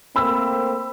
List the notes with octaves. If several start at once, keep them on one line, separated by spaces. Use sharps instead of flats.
A3 A#3 C4 B5 E6